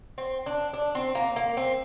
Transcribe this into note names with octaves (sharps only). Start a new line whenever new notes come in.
C4
D4
D4
C4
A#3
A#3
C4